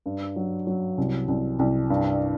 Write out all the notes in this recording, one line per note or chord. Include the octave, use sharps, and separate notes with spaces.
G2
F#3
F#3
C2
C2
C2
G2